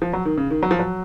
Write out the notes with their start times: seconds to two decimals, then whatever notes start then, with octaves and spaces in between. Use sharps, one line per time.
0.02 F3
0.13 F#3
0.25 D#3
0.38 C#3
0.50 D#3
0.63 F#3
0.71 F3
0.79 F#3